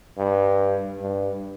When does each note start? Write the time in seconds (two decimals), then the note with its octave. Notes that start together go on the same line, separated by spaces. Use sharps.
0.18 G2
1.01 G2